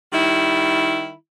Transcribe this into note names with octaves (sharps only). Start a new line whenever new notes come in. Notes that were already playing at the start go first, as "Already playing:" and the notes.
D#3 G3 E4